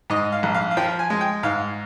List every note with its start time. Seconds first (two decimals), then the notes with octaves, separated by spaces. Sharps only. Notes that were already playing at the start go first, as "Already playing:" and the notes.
0.10 G#2 D#5
0.32 F5
0.43 A#1
0.54 F5
0.71 F5
0.77 F3 G5
0.99 G#5
1.10 G#3
1.21 G5
1.43 G#2 F5